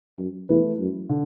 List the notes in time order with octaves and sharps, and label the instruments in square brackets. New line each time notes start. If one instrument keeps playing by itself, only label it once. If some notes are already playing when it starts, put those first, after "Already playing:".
[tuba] F#2
[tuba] E2 [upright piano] E3 A3 E4 B4
[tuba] F#2
[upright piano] D3